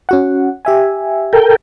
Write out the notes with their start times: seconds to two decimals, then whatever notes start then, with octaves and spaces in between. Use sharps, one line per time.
0.09 C#4 F#4 F#5
0.65 G4 E5 G#5
1.33 A4 A#4 G5